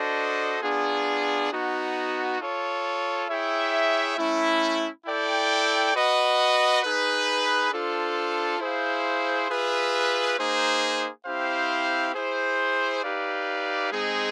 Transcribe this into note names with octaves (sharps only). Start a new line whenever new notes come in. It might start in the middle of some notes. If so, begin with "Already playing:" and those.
Already playing: D4 F#4 A4 C5 D#5
B3 D4 F4 G#4
B3 D#4 F#4
F4 A4 C#5
E4 G#4 C#5 E5 G5
A3 C#4 E4
E4 A4 D5 G5
F#4 B4 D#5 F#5
D#4 G#4 B4
D4 F4 A4 C5
E4 G#4 C5 F5
F4 G#4 B4 E5
A#3 D#4 G#4 C5
C4 E4 G4 C5 F5
E4 G#4 C5
D#4 G4 B4 D5 F5
G#3 C4 D#4 G#4